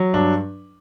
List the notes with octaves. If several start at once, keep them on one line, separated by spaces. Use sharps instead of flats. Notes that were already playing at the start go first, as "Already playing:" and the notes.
Already playing: F#3
G2 D4